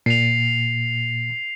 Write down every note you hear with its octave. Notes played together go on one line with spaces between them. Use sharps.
A#2 C7 F7